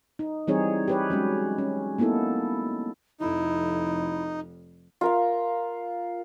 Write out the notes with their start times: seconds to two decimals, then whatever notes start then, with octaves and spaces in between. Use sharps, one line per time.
0.19 D#4
0.47 E3 G3 C4 D#4 G#4 C#5
0.88 G4 B4 C#5
1.10 F#3 G#3 C#4
1.58 C#4
1.98 A#3 B3 D#4 E4 A4
3.20 F1 F2 D#4 E4
5.01 F4 A#4 F5